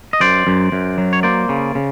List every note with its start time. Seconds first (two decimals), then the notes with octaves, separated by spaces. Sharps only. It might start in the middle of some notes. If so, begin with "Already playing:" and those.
0.13 D#5
0.20 F#2 C5 D5
0.47 F#2
0.72 F#2
0.98 F#3
1.13 C#5
1.23 A#3 C5 D5
1.49 C#3
1.75 C#3